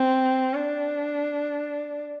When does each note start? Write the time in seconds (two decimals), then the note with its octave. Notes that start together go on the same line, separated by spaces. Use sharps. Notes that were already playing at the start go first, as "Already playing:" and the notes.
Already playing: C4
0.53 D4